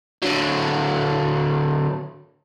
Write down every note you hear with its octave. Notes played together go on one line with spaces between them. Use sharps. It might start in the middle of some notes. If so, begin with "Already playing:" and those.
D3 F#3